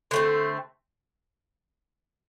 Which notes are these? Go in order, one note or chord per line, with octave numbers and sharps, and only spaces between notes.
D3 A3 C4